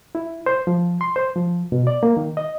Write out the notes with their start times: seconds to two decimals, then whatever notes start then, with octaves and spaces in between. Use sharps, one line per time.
0.15 E4
0.46 C5
0.67 F3
1.01 C6
1.16 C5
1.36 F3
1.72 B2
1.87 D5
2.03 A#3
2.17 D#3
2.37 D#5